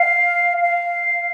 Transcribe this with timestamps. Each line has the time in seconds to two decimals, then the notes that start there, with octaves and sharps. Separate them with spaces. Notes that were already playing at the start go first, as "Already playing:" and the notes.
Already playing: F5
0.62 F5